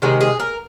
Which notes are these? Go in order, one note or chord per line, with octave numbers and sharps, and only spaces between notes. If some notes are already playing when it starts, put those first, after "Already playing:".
C3 D#3 G#3 G#4
G#4
A#4